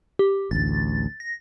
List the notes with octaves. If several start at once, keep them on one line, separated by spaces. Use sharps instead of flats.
G4
A1 D2 A6
A#6